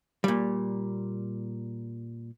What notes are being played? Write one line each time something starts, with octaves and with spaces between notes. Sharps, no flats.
A#2 G3